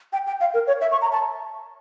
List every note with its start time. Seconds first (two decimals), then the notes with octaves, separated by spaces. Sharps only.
0.13 G5
0.27 G5
0.41 F5
0.54 A#4
0.67 C#5
0.81 E5
0.92 C#6
1.02 A#5
1.12 A5